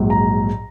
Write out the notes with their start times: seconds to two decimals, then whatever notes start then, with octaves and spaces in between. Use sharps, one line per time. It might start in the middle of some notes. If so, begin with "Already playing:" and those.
Already playing: A#1 G#2 F#3
0.10 A#5